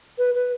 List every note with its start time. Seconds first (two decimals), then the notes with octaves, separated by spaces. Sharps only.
0.18 B4
0.35 B4